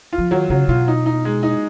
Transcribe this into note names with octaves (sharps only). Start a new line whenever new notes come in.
F4
F3
D#3 F#3
C#3 F#3
B2 F4
D#4
D#4
G#3
D#4